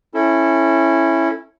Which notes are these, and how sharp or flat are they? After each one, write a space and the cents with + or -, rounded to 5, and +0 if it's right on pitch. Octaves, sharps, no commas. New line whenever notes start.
C#4 -15 E4 +0 A4 +0